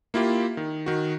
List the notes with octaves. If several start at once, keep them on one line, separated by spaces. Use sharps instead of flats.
A#3 E4 F4 G4
D#3
D#3 F#4